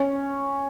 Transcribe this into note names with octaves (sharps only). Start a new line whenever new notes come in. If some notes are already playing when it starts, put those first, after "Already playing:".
Already playing: C#4